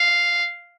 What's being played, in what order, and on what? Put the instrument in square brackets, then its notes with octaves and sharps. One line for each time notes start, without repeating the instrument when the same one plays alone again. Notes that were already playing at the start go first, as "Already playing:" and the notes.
Already playing: [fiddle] F5